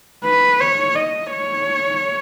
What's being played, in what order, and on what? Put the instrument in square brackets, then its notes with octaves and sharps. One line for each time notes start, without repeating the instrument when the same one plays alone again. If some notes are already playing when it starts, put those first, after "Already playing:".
[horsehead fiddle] B4
C#5
D#5
C#5